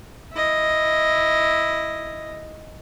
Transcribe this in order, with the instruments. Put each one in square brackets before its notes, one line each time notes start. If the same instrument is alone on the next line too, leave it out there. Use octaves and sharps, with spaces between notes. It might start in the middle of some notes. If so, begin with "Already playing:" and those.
[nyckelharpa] E4 D#5